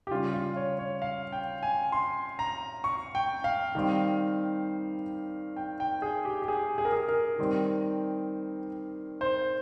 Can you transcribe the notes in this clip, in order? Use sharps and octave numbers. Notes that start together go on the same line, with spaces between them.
G4
C#3 G3 C#4 F4
F4
C#5
C#5
F5
G5
G#5
C6
A#5
C#6
G5
F5
D#3 G3 C4
G5
G5
G#4
G4
G4
G#4
G#4
A#4
G#4
A#4
D#3 G3 C4
C5